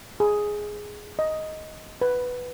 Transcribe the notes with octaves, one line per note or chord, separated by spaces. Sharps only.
G#4
D#5
B4